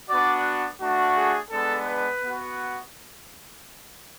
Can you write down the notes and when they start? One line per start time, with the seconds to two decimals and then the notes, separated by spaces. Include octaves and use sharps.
0.10 B3 D4 F#4 D5
0.81 A3 D4 F#4
1.16 G#4
1.51 G#3 B3 D4 A4
1.86 B4
2.22 B3 F#4